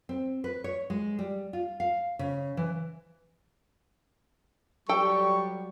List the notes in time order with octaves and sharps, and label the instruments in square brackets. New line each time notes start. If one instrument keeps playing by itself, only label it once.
[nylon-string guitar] C4
B4
C#5
G#3
G3
F4
F5
C#3
E3
[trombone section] F#3 G3 [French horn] G4 [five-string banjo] A4 G5 [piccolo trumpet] C#6